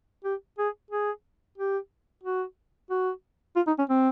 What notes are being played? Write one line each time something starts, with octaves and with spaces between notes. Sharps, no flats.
G4
G#4
G#4
G4
F#4
F#4
F4
D#4
C#4
C4